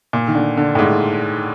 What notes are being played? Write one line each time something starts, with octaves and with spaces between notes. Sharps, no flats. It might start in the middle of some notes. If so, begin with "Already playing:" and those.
A#2
D#3
D3
D3
A2
G#2